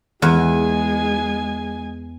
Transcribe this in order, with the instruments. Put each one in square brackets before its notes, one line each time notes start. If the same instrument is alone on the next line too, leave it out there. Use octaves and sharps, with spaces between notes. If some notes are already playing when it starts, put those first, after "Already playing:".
[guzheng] E2 [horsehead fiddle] G#3 G#5